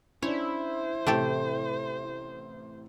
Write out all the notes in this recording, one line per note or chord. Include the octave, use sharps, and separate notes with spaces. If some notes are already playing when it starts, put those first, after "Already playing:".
C#4 D4 E4 C5 C#5
A1 C3 A3 G4 A4